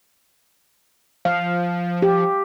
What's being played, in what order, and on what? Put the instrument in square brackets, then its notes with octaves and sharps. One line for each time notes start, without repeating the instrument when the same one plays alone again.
[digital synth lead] F3 [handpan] F5
[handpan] G4